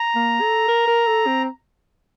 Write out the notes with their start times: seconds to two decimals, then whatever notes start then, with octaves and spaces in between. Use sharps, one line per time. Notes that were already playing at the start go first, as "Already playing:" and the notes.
Already playing: A#5
0.15 A#3
0.41 A4
0.68 A#4
0.87 A#4
1.07 A4
1.27 C4